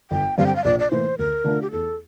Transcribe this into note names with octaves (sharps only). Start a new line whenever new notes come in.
G1 G5
G2 D3 G3 C4 F5
G5
F5
A#1 D5
D5
A2 E3 A#3 C5
D2 A#4
D3 A3 D4 F4
G4
E2 A4